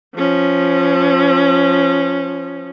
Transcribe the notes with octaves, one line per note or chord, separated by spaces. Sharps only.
F3 C#4